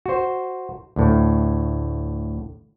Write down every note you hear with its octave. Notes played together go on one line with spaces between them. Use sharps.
F#4 C5
D2 A2